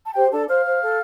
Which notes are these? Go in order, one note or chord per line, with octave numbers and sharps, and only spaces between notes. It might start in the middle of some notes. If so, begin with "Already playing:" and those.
A5
G4 C5 G5
D4 A4 A5
C5 F5 F6
C5
A4